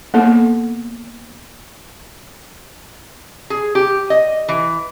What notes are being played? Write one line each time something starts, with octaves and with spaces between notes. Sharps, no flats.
A#3 B3 A4
G#4
G4
D#5
E3